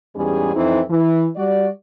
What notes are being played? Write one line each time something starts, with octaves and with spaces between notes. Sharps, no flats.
E2 G#2 G3 C#4 G#4
F2 E3 C4 D#4 E4
E3
G3 F#4 D5